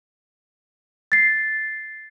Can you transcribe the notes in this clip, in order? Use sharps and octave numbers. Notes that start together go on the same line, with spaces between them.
A6 C7